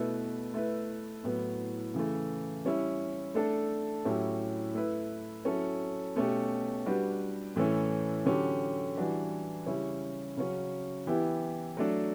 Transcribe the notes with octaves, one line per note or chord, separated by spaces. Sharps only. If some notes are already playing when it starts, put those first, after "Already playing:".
Already playing: B2 A3 E4 B4
A3 E4 B4
A2 F#3 B3
C#3 E3 A3
G3 C#4 E4
A3 D4 A4
A2 F#3 C#4 E4 G4
A3 E4 B4
F#3 C#4 E4 A4
B2 A3 C#4 G4
G3 D4 F#4 B4
A2 E3 A3 C#4
D3 F#3 C#4 G4
E3 G3 D4 F#4 B4
C#3 G3 C#4 E4
C#3 F#3 C#4
E3 B3 E4 G4
F#3 A3 D4